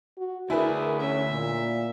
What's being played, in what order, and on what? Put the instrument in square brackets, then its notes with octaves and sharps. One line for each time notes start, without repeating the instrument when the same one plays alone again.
[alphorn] F#4
[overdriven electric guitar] D2 G#5 [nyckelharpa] D4 G#4 [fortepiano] E4 B4 [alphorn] A#4
[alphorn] C#4 [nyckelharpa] E5
[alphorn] A#2